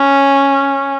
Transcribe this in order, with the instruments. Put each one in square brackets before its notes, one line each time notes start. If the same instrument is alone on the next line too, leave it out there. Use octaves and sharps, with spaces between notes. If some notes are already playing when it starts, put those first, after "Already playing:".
Already playing: [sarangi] C#4